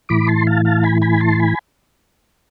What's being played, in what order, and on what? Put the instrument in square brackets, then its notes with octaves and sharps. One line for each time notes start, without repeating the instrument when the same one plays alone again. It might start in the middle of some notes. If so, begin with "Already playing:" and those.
[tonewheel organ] A2 E3 B5 D6
A5 C6
F5 A5
F5 A5
G#5 B5
G#5 B5
A5 C6
G#5 B5